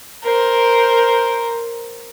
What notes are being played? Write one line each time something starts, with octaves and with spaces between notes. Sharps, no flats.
A#4 C5